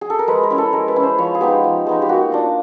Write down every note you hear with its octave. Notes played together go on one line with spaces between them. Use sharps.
G#4
A4
A#4
G#3 B4
A#4
C#4 E4
A4
G#3 A#4
B4
C#4 E4
C5
F3 C#5
G#4
G#3 B3 D#4 G4
F3
G#3 B3 D#4
G4
A#3 F#4
D4 F4